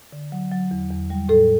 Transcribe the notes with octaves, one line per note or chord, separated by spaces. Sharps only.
D3
F#3
F#3
E2
E2
G3
A2 A4